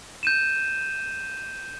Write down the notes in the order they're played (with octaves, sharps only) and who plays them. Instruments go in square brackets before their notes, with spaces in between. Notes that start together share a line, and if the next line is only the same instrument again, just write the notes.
[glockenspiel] G6 D#7 E7